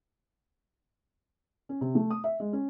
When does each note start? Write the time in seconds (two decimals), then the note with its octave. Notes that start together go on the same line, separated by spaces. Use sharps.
1.69 C#4
1.81 C3
1.95 A3
2.10 D#6
2.24 E5
2.40 G#3
2.53 C#4